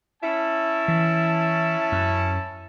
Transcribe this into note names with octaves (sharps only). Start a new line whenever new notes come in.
C#4 E4 A5
E3
F#2